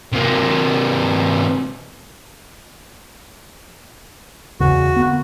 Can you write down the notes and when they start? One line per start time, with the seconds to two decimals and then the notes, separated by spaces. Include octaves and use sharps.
0.13 C3 A#3
4.60 E2 C#3 F#4
4.96 D3 A#3 B3